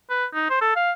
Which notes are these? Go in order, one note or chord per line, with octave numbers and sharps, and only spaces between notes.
B4
D#4
C5
A4
F5